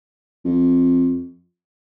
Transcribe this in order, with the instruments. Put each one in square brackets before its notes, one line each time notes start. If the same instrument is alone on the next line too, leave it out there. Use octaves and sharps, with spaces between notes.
[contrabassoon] F2